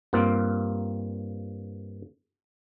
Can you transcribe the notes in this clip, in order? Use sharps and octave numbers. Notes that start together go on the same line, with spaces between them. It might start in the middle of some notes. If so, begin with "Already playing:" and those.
G2 A#3 C4 F4